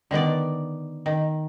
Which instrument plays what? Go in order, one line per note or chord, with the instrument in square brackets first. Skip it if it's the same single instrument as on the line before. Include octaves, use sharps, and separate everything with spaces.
[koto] D3 D#3 B3 D5
D#3